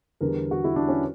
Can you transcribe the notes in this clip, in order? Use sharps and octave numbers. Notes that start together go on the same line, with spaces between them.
E2 D3 G3 A#4
F#4
E4
D4
C#4